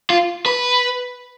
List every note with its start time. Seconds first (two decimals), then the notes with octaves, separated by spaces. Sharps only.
0.10 F4
0.46 B4